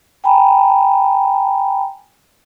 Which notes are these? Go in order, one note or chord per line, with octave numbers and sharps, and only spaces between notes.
G5 G#5 A#5 B5